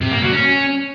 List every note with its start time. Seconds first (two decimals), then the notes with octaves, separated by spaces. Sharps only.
0.01 C3
0.12 A#3
0.22 F#3
0.33 C#4